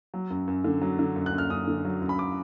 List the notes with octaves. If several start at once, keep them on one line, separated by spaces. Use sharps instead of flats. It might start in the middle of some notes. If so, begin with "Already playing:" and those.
F#3
F#2
F#2
D3
F#3
D3
F#2
F#6
F#2
F6
F#2 D#6
D3
F#3
F#2
B5
D6